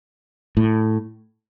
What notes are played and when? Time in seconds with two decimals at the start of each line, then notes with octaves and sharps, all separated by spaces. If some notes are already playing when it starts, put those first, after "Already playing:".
0.57 A2